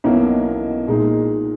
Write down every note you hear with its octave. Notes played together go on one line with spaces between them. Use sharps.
B1 B2 A#3 C#4 E4
A#2 G#3 D#4